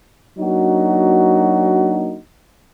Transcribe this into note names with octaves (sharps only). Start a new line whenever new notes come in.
F#3 A#3 D4 D#4 F#4